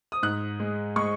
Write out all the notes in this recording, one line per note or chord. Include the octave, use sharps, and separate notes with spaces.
D#6
G#2 F#6
G#3
G#3 C#6